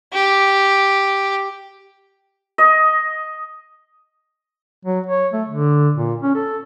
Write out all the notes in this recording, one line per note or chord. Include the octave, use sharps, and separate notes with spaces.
G4
D#5
F#3
C#5
A3
D3
A#2
C#4
A4